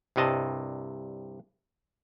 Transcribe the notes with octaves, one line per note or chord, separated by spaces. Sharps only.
C2 G2 C3 D#5 A5